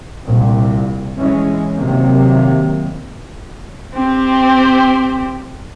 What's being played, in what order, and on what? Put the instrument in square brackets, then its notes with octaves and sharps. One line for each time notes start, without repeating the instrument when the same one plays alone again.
[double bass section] C2 A#2
E3 G#3 C#4
C3 D#3 F#3 A#3
[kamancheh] C4 G4